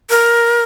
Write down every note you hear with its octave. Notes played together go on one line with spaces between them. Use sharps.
A#4